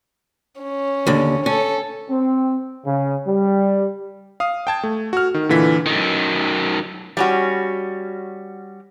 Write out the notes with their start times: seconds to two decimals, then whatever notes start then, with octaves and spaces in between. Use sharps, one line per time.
0.60 C#4
1.07 D#2 D3
1.46 C#4 A4
2.09 C4
2.85 C#3
3.26 G3
4.40 F5 D#6
4.67 G5 A5 G#6
4.83 A3
5.13 F#4 F6
5.34 D#3
5.49 A#2 D3 E3 B6
5.86 F#2 D#3
7.17 G3 C#4 F#4